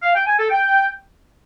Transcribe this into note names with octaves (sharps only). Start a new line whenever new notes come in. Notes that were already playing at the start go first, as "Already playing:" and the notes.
F5
G5
G#5
A4
G5